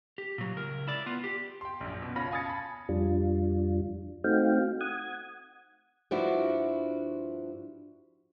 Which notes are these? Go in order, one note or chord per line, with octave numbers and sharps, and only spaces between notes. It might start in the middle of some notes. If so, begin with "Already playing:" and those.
G4
A#2 F#3
C#2 A#4
E4 D5
B3 F4
G4
G5 C6
A#1 F#2
B2
F#1 C#4 F4 B5 A#6
F5 G#5 D#6 G#6 A6 C#7
A5 B5
F2 G3 D4 F4
A3 C4 D#4 F#4 F5 G5
F#5 D#6 G#6
G2 F3 D4 E4 F#4